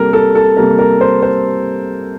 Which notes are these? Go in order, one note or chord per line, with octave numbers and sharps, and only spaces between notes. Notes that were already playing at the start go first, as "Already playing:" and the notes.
Already playing: C3 G3 A#3 A4 A#4
A4
A4
C3 G3 A#3 A#4
A#4
C5
C5